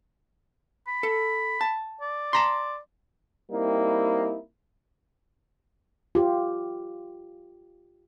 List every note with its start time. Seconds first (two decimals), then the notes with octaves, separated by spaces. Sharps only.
0.87 B5
1.03 A4
1.61 A5
2.01 D5
2.33 A5 A#5 C6
3.51 G3 A#3 C4 D#4 E4
6.15 F4 G4